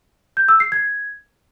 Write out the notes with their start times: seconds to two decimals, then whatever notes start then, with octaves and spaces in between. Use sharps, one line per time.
0.37 G6
0.49 E6
0.60 C7
0.72 G#6